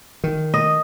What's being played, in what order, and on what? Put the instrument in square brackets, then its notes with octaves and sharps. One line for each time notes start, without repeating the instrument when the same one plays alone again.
[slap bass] D#3
[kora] D#5